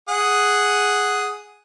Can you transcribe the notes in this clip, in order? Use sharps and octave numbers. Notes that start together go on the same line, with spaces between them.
G#4 F#5 D#6